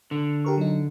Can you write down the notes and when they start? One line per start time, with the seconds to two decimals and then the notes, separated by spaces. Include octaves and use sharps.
0.11 D3
0.45 G4 A#4 C#6
0.58 F#3 D#4